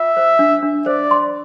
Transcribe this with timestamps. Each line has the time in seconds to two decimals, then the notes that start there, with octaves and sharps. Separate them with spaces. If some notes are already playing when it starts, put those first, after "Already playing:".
Already playing: F4 E5
0.17 C5
0.39 D4
0.63 D4
0.86 C5 D5
1.11 C6